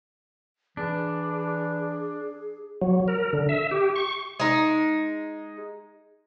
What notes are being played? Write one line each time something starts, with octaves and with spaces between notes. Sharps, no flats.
E3 D4 G#4
F#3
A#4
D3
E5
G4
C#6
G#3 D#4